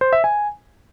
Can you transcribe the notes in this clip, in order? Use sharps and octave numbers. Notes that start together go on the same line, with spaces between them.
C5
E5
G#5